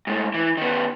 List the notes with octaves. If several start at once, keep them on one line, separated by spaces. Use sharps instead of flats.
G#2 A3
E3
D#3 B3